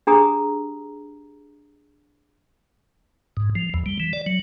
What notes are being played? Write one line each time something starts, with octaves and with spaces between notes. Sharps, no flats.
D4 G4 G#4 A#5 D#6
G#2
F3
E2
G3
E3
D5
F#3